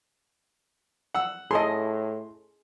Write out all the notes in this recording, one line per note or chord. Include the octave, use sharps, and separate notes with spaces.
F#5 E6
A2 G#4 A4 D#5 C6